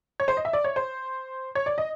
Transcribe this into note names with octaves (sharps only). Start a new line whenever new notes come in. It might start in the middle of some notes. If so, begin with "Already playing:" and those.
C#5
C5
D#5
E5
D5
C#5
C5
C#5
D5
D#5